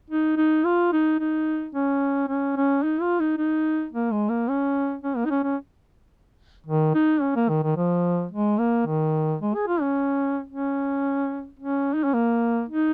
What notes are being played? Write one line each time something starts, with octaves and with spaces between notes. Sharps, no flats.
D#4
D#4
F4
D#4
D#4
C#4
C#4
C#4
D#4
F4
D#4
D#4
A#3
G#3
A#3
C#4
C#4
A#3
D#4
C#4
C#4
D#3
D#4
C#4
A#3
D#3
D#3
F3
G#3
A#3
D#3
G#3
G#4
F4
C#4
C#4
C#4
D#4
C#4
A#3
D#4